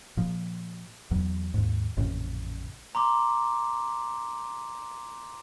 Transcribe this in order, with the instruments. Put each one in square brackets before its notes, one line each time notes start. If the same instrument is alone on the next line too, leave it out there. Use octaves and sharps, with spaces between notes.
[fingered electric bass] A#2 F3
E2 F#3
D#2 G#2
A1 F2 A#2 C#3
[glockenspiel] A#5 C6 D6